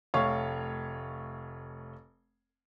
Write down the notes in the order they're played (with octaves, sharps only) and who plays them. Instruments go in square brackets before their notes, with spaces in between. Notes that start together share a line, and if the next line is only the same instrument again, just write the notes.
[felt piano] F1 A3 C#5 F5 C#6